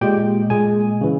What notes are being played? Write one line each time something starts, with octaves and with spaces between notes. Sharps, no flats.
A#2 G#3 G4 G5
A#2 G#3 G#4 G#5
C#3 E3